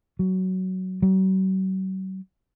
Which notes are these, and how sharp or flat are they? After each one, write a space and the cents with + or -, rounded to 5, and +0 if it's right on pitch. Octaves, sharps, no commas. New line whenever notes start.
F#3 +10
F#3 +40